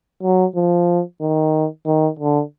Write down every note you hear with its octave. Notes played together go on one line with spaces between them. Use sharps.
F#3
F3
D#3
D#3
D3